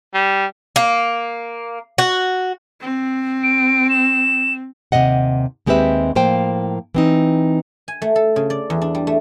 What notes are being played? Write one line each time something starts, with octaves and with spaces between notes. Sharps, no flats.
G3
A#3
F#4
C4
D7
E7
D#2 C3 F3 G#3 D#5 F#5
D#2 G#3 C4 G4 B4 E5
A2 F3 A#3 C5 F5 G5
E3 C4 D#4
G#5
A3
A4
C#3
D5
E2
D4
G3
A3